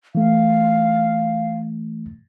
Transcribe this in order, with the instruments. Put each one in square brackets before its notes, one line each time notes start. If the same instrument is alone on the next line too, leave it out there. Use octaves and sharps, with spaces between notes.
[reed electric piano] E3 A3 [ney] F5